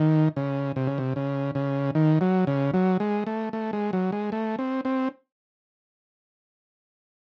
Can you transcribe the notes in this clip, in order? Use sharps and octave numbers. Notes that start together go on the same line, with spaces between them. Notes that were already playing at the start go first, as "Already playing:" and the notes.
Already playing: D#3
C#3
C3
C#3
C3
C#3
C#3
D#3
F#3
C#3
F#3
G#3
A3
A3
G#3
F#3
G#3
A3
C4
C4